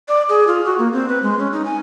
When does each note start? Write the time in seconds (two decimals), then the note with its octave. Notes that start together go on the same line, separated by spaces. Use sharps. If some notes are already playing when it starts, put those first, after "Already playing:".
0.08 D5
0.29 G#4
0.47 F4
0.65 F#4
0.78 A#3
0.93 C4
1.09 B4
1.23 G#3
1.39 C#4
1.52 D#4
1.65 G#5